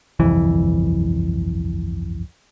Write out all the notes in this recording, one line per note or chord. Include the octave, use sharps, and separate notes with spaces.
G1 C2 F2 E3